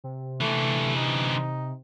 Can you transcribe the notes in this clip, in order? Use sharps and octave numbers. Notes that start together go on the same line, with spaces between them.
C3
D3 E3 A3
D#4